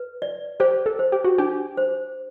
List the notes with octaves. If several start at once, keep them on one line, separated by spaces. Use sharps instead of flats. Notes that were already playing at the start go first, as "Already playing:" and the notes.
Already playing: B4
D5
G4 C5
A4
C5
G4
F#4
D4 G4
C5